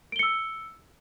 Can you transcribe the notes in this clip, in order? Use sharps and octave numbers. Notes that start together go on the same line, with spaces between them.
E6 C#7 D7 G7